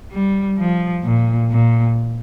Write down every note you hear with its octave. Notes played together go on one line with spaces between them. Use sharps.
G3
F3
A#2
A#2